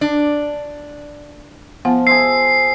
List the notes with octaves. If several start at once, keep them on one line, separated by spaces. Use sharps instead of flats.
D4
F3 B3 F#5
G#4 C5 E5 C7